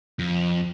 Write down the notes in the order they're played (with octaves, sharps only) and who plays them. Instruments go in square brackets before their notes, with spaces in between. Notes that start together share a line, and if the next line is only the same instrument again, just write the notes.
[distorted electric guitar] F2